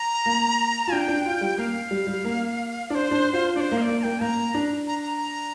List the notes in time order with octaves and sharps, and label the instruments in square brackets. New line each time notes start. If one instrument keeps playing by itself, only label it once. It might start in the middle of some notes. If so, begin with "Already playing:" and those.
Already playing: [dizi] A#5
[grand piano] A#3
F4
[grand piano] D4 [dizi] G5
[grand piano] D4
F4
G3
[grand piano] A#3 [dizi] F5
[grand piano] G3
G3
A#3
[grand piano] D4 [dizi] C5 D5
[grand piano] D4
F4
[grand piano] D4 [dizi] C5 D5
[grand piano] A#3
[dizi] F5
D5
[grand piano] A#3
[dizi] A#5
[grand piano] A#3 [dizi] G5
[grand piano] A#3 [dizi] A#5
[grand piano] D4
[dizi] A#5
A#5